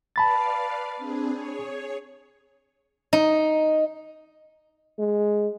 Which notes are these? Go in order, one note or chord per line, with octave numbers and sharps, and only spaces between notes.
B4 D5 F5 A5 B5 A6
C4 D4 G#4
G#4 C#5
D#4
G#3